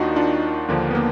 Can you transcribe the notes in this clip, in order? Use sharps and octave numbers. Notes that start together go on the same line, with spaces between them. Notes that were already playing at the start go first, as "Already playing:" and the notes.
Already playing: D#2 D#3 D4 D#4 F4 F#4
D4 F4
D#2 D3 F3 A#3 D4
B3
A#3